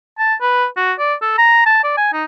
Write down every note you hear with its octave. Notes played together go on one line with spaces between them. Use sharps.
A5
B4
F#4
D5
A4
A#5
A5
D5
G#5
D#4